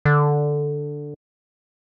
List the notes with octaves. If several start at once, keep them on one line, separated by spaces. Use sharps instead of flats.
D3